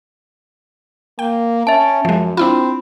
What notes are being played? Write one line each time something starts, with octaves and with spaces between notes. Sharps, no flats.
A#3 G5
C#4 E5 A5
F#2 F3 G#3
C4 D4 E4 F4 B5